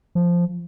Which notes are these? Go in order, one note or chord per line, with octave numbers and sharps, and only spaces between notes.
F3